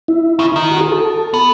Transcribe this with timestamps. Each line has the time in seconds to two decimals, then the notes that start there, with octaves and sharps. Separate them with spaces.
0.08 E4
0.39 C#3
0.56 D#3
0.71 F#4
0.81 G#4
0.92 A4
1.34 B3